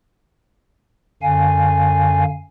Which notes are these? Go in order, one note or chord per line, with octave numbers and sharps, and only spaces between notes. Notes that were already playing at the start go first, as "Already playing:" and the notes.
F#2 D3 F5 G#5